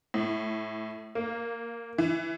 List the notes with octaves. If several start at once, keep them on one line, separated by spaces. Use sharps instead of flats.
A2
A#3
E3